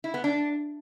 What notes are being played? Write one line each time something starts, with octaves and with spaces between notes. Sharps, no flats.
E4
B3
D4